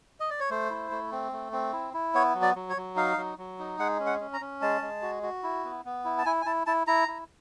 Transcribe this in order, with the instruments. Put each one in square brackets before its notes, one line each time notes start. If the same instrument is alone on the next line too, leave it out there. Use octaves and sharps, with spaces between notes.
[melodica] D#5
D5
C#5
A3 C5
E4
A3
C4
A3
C4
E4
E4
B3 C#5
F#3
D5
F#3
C#5
F#3
D#4 F5
F#3
F#3
D#4
G#3 F#5
C#4
F#5
C#4
A#5
C#4
G#3 A5
G#3
F#4
F#4
E4
B3
B3
E4
A5
E4 G#5
G#5
E4 A5
E4 A5
E4 A#5
E4